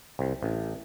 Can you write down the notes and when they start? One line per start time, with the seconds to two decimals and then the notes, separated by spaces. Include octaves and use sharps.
0.19 C2
0.43 A1